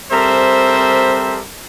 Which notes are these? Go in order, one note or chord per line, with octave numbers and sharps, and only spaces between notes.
G3 C4 A4 A#4 C5 E5